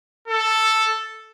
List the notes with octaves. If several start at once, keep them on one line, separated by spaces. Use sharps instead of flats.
A4